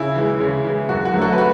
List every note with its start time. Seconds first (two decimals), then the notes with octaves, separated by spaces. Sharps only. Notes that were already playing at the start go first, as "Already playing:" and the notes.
Already playing: C#3 E4
0.15 E3 G#3
0.40 C#3
0.64 E3 G#3
0.89 F#2 F#4
1.05 F#4
1.14 D3 F#3 A3
1.22 F#4 A4
1.33 B4
1.38 F#4